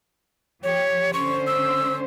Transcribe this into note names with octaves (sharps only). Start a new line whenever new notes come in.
F3 G4 C#5
D3 C#4 C5 C#6
E6